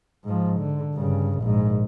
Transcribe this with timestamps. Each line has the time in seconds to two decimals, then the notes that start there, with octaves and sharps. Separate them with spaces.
0.25 G#2 F3
0.60 D3
0.95 G2 C#3
1.40 A#1 G#2